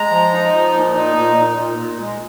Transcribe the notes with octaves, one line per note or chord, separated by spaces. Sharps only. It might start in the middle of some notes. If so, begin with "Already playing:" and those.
Already playing: G#3 A#5
F3
D#4
F3
A#2
D#4
A#2
A#2
A#2
A#2
G#3